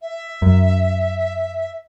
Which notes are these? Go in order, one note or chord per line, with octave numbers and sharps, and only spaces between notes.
E5
F#2